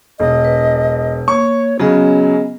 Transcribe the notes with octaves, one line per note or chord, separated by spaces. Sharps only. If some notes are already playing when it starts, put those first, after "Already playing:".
E1 D#5
B4
A#3 C#5 C#6
C#3 F#3 B3 C#4 G#4 D#5